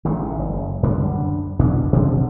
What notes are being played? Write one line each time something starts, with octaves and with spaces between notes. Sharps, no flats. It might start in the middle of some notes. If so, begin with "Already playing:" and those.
A1 D#3 G#3 A3
F#1
F#2 D3 G3 D4
E2 B2 D4
B2 D3 F3 C4